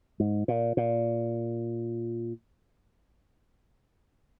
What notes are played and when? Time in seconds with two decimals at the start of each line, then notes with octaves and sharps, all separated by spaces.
0.20 G#2
0.48 A#2
0.77 A#2